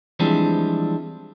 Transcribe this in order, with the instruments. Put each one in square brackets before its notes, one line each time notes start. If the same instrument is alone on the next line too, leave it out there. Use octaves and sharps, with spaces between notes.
[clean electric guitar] E3 F3 G3 G#3 C4 D4